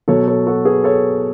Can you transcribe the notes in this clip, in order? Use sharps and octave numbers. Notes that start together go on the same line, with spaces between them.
B2 F#3 A4 C#5
A4 C#5
F#4 A4
G#4 B4
A4 C#5